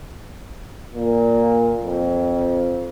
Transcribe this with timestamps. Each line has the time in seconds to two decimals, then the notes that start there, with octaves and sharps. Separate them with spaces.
0.94 A#2
1.83 F2